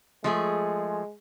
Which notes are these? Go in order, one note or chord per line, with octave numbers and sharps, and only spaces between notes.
F3 G#3 A3 G#4